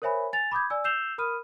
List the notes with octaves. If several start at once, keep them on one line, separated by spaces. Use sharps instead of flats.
A#4 C5 C#5 E5 G#5 B5
G#5 A6 F7
B5 D6 D#6 G6 G#6
D5 G#5 E6
E6 G6 C7 E7 F7 G7
A#4 B5 D#6 F6 D#7